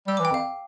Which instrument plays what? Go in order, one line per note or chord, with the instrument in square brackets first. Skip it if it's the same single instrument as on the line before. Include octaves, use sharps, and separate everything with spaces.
[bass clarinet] G3 [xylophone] E6
[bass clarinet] E3 [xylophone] D6
[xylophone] G5
[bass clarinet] F2 [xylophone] F5